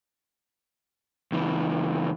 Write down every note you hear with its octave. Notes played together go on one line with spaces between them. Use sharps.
C#2 E3